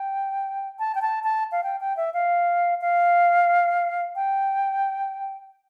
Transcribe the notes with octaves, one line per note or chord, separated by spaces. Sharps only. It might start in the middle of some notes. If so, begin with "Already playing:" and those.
Already playing: G5
A5
G5
A5
A5
F5
G5
G5
E5
F5
F5
G5